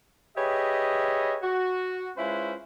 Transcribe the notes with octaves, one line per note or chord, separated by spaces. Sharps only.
G4 G#4 B4 C#5 D#5 E5
F#4
G#3 C#4 E4 F4 B4 C5